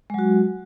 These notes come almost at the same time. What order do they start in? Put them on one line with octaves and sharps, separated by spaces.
G#3 F#3 F#4